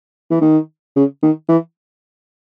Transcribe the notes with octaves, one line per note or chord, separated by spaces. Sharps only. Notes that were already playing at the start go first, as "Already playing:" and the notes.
E3
D#3
C#3
D#3
E3